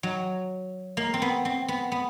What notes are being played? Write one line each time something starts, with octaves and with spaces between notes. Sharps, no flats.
F#3
A#3
C4
B3
C4
B3
B3